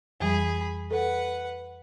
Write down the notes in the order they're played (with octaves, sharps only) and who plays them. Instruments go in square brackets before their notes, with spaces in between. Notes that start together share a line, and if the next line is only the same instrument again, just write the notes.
[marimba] F2 E3 G3 [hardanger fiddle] G#4 B5
[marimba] A4 [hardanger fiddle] B4 F#5